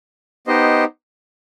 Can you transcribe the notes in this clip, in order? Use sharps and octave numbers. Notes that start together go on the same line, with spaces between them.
B3 D#4 G4 C5 D#5